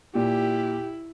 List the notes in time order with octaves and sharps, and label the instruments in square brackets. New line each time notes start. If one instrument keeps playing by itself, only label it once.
[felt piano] A#2 [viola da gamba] E4 [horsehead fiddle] G4